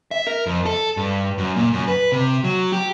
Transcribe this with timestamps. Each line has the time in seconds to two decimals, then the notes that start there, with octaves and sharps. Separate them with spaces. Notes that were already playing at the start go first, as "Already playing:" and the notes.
0.11 E5
0.27 A#4
0.46 F2
0.66 A4
0.97 G2
1.38 F#2
1.56 A#2
1.73 F#2
1.88 B4
2.12 C3
2.44 F#3
2.72 G4